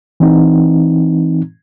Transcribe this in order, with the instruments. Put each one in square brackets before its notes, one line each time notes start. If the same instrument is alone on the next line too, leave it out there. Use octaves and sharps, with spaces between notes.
[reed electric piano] E3 C4 D#4